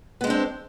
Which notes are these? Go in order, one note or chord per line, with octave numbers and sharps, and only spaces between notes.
G#3 B3 C4 D4